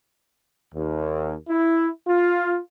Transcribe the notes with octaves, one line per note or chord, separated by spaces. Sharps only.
D#2
E4
F4